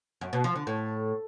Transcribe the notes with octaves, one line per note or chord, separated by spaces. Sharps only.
F#2
B2
F3
D3
A2